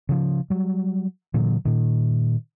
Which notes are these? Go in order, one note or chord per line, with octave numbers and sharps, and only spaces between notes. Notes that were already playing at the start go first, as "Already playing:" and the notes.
C#3 F3
F#3 G3
A#2 D3 E3 F#3
A#2 D#3